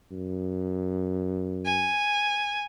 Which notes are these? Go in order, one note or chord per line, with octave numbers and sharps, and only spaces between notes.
F#2
G#5